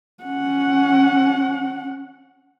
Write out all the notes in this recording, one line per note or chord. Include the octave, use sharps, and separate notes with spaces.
C#4 F#5